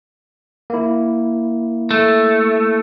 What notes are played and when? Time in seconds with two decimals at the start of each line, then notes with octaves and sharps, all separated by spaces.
0.70 A#3 E4
1.91 A3